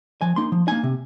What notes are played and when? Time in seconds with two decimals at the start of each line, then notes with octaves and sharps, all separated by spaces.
0.21 F3 G#5
0.36 A#3 D#4 C6
0.52 F3
0.67 A#3 D#4 G#5
0.83 C3